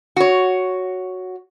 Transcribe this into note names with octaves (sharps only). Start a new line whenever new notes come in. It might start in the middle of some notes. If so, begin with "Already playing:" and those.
F#4 C#5